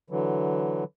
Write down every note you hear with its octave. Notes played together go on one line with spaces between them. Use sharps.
D3 E3 F#3